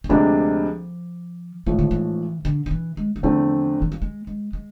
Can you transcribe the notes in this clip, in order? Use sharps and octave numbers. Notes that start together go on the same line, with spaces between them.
E3
D2 C3 F3 G#3 D4
A1 G#2 E3 F3 A3
D3
E3
D3
D3
E3
G#3
E3
E2 D3 F3 A3 C4
E3
F3
G#3
G#3
G#3